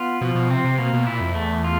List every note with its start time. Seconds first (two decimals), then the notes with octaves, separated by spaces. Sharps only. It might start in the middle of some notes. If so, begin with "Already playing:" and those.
Already playing: B3 F4
0.21 B2 F3
0.35 B2
0.50 C3 C4
0.64 C3
0.78 B2 A#3
0.93 B2
1.06 A#2 E4
1.21 F2
1.35 E2 A3
1.64 F4